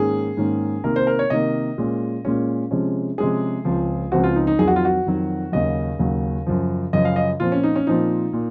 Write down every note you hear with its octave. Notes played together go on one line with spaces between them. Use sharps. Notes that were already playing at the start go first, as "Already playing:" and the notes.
Already playing: G#2 D#3 A#3 C#4 G#4
G#2 D#3 A#3 C#4
C3 D#3 A#3 A#4
C5
A#4
C#5
C3 D#3 A#3 D#5
A#2 G#3 C#4
A#2 G#3 C#4
C3 F3 G#3 C#4
C3 F3 G#3 C#4 G#4
C#2 C#3 F3 C4
C#2 C#3 F3 C4 F#4
F4
D#4
D#4
F2 D#3 F#3 G#4
F#4
F4
F#4
F2 D#3 F#3
D#2 C#3 F#3 D#5
D#2 C#3 F#3
F#2 C#3 F3
F#2 C#3 F3 D#5
F5
D#5
A#2 F3 C4 F4
C#4
D#4
C#4
A#2 F3 C4 D#4
A#2